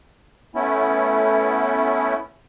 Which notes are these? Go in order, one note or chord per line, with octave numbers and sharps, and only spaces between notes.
A3 B3 C#4 E4